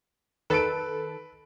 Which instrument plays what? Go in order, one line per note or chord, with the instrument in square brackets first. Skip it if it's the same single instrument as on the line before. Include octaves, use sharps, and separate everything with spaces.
[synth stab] D#3 A4 [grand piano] B4 D7